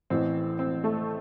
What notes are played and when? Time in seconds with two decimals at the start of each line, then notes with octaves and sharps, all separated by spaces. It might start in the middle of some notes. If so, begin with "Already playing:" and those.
0.10 A1 A2 E3 C4
0.59 C4
0.84 A3